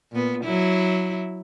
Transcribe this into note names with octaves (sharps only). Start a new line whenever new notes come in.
A#2 B3
F#3 E4